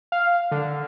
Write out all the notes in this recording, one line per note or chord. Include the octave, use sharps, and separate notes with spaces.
F5
D3